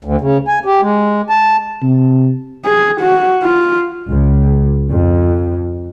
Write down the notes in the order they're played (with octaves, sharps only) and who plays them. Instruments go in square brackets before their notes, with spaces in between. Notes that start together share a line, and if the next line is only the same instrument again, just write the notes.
[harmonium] D2
C#3
G#5
G4
G#3
A5
[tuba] C3
[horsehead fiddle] G#4
F#4
F4
[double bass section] C#2
F2